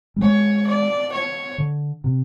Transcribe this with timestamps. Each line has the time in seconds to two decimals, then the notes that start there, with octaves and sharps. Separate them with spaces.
0.16 G3
0.22 G#3 C#5
0.67 D5
1.13 C#5
1.58 D3
2.04 C3